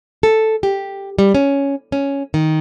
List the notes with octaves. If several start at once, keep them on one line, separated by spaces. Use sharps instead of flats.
A4
G4
G3
C#4
C#4
D#3